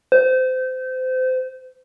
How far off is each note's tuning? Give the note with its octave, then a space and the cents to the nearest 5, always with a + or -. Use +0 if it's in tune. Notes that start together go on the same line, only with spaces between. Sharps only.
C5 -25